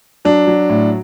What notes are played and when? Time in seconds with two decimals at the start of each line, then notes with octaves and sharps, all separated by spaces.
0.25 F#3 D4
0.47 F#3
0.70 A2